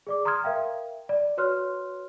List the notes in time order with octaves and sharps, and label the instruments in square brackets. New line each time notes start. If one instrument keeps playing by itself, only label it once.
[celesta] G#4 D5 D6
A#5 C6 D#6 F6 G#6
A#4 E5 F5 G5
D5
F#4 B4 C#5 C6 F6 F#6